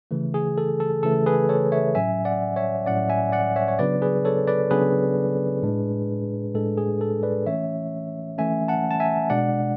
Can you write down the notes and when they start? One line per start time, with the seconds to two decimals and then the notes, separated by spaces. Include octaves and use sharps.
0.11 C#3 E3 A3
0.34 G#4
0.58 A4
0.80 A4
1.03 C#3 E3 A3 A4
1.26 G#4 B4
1.49 A4 C#5
1.72 C#5 E5
1.95 A2 F#3 C#4 E5 G#5
2.25 D5 F#5
2.56 C#5 E5
2.86 A2 F#3 C#4 D5 F#5
3.09 E5 G#5
3.32 D5 F#5
3.56 C#5 E5
3.68 C#5
3.79 C#3 F#3 B3 D4 B4 D5
4.02 G#4 B4
4.25 A4 C#5
4.48 B4 D5
4.71 C#3 F#3 B3 D4 G#4 B4
5.62 A2 G#3 D4
6.54 A2 G#3 D4 A4
6.78 G#4
7.01 A4
7.23 B4 D5
7.46 E3 A3 C#4 C#5 E5
8.38 E3 A3 C#4 E5 G#5
8.68 F#5 A5
8.91 A5
9.00 E5 G#5
9.30 B2 G#3 D4 D5 F#5